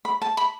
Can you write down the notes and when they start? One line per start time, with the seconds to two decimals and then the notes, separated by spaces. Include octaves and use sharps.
0.05 B5
0.22 A5
0.37 B5